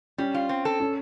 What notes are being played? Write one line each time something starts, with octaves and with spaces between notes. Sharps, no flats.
G3 C#4
F4
C4
A4
C#4